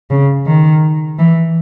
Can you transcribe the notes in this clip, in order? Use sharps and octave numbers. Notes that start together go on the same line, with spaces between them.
C#3
D#3
E3